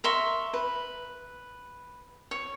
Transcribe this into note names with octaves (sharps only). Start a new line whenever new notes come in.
A#4 E5 C6 C#6
B4
C#5